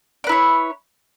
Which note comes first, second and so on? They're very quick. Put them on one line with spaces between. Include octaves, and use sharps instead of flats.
D5 B4 E4 C#5